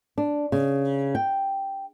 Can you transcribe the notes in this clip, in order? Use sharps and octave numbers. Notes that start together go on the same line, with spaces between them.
D4
C#3
G5